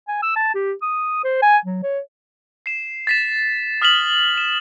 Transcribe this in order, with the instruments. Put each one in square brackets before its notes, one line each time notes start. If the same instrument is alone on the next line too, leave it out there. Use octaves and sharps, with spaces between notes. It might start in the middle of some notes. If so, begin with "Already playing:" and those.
[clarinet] G#5
E6
A5
G4
D#6
C5
G#5
F#3
C#5
[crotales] C7 E7
A6 B6 E7
D#6 F6 B6 F7 F#7
E7